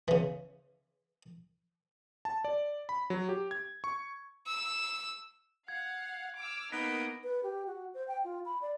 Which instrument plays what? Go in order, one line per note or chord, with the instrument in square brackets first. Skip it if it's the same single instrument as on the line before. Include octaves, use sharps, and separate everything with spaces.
[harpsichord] C#3 E3
[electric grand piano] A5
D5
B5
F#3
G4
G#6
C#6
[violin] E6
[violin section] F5 F#5 [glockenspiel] G#6
[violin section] D6 E6 F6
[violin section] A#3 D#5 [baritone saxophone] B3 [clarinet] D#4 [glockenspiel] A#6 B6 D7
[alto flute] B4
G4
F#4
C5
G5
F4
B5
D5